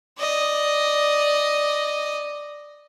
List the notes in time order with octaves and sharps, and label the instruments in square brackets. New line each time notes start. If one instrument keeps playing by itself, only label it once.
[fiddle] D5 D#5